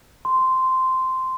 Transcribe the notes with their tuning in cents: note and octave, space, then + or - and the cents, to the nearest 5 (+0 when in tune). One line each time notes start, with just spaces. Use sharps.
C6 -10